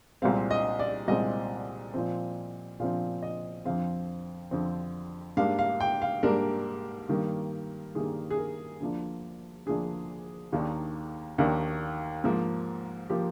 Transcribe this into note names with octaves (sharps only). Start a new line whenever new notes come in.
C2 A#2 G#3 C4 F5
D#5
D5
C2 A#2 G#3 C4 D#5
A#2 F3 C4
A#2 F3 C4 F5
D#5
F2 D3 F3 C4 F5
F2 D3 F3 C4
G#2 G3 A#3 D4 F5
F5
G5
F5
G#2 G3 A#3 D4 A#4
G2 D#3 G3 A#3
G2 D#3 G3 A#3 G#4
G#4
A#4
D2 D3 F3 A#3 D4
D2 D3 F3 A#3 D4 G#4
D#2 D#3 A#3 D4
D#2 D#3 A#3 D4
G#2 F3 A#3
F3 A#3 G4